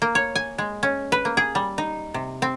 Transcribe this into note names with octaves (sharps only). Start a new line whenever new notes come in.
A#3
C#5
G#5
G#3
C#4
B4
A#3
G#4
G3
D#4
C3
C4